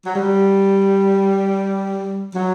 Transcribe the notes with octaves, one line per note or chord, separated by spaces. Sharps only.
F#3
G3
F#3